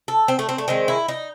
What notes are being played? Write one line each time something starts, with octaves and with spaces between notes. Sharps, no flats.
A4
C4
A3
C4
A3
D#3 G#3 C4
E4
D#4